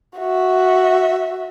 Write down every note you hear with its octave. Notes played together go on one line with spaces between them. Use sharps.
F#4 E5